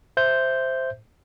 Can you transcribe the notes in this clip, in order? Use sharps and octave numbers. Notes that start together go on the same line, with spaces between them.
C5 E5 G6